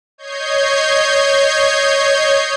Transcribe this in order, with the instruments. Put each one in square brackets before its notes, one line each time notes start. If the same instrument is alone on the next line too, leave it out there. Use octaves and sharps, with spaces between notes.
[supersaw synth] C#5 D#5 G6 G#6 C7